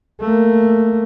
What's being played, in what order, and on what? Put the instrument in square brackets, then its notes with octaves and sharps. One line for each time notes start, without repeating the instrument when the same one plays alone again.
[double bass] A3 A#3